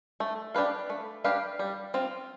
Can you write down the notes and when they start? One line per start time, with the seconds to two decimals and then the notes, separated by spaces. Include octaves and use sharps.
0.20 A3
0.54 D4 G4 B4 F5
0.90 A3
1.24 D4 G4 B4 F5
1.59 G3
1.94 C4 F4